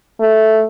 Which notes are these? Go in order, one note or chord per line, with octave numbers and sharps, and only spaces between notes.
A3